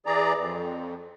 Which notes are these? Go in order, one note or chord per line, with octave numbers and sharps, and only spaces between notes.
E3 G#4 D5 A#5
F2